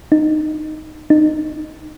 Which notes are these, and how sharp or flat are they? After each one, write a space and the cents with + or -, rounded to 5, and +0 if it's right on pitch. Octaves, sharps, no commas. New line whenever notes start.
D#4 -15
D#4 -25